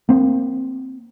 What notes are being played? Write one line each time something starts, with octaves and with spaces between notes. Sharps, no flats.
A#3 C4